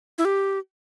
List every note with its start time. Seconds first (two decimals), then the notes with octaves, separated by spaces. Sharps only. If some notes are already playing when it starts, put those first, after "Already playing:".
0.18 E4
0.25 G4